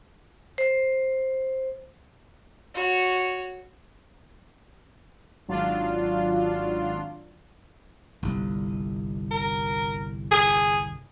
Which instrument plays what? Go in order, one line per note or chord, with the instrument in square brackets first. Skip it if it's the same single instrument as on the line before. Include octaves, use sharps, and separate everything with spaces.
[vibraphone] C5
[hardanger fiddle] F#4 C#5
[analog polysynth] G#1 F#3 D4 F4
[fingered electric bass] G1 C2
[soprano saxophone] A#4
G#4